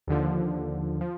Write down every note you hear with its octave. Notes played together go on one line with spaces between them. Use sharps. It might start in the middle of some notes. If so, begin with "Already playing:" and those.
D#2 D3 F3
F3